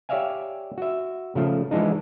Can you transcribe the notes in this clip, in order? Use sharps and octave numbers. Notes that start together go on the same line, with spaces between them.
G4 C#5 D5 E5 F5 G#5
F#4 E5
C#3 F3 A3
E3 F3 G#3 D4 D#4